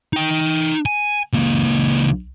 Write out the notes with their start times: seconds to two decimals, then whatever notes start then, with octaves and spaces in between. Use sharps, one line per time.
0.13 D#4 G5
0.86 G#5
1.33 C#2 A#3